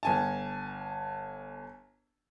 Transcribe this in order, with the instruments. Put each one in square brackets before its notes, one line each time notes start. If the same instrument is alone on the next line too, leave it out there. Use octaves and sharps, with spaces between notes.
[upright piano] G1 G#5 A5